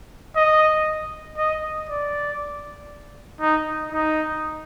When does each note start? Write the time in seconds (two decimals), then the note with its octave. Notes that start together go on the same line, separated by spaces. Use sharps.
0.36 D#5
1.37 D#5
1.89 D5
3.41 D#4
3.92 D#4